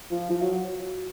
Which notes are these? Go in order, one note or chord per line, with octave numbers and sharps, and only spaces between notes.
F3
F3
F#3